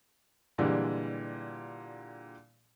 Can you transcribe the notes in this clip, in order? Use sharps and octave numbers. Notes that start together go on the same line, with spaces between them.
A#2 D3 E3 G3 G#3